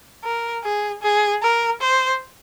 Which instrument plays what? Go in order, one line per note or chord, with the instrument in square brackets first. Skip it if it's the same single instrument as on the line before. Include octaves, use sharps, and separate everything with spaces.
[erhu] A#4
G#4
G#4
A#4
C5